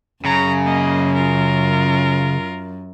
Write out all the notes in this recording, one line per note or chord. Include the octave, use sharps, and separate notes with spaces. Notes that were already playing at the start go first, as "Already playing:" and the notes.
F#2 C#3 A#5
A#3 D#5
F4 A#4